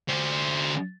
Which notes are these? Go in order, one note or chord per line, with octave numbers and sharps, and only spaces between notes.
D3 C5